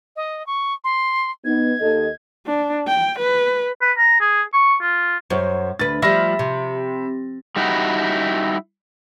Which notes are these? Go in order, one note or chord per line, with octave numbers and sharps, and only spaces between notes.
D#5
C#6
C6
B3 D#4 G#6
D#2 A4 D#5
D4
G5
B4
B4
A#5
G#4
C#6
F4
F#2 C5 C#5
D2 B4 A6
F3 G3 E5 B5 A#6
C3
G3 D#4 E4 F#4